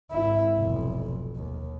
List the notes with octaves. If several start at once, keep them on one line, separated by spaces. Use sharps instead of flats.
G#1 E4
F1 B1
D#2